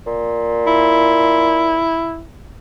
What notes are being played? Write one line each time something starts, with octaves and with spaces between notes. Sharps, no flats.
A#2
E4